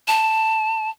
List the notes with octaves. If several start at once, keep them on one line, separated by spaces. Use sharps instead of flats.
A5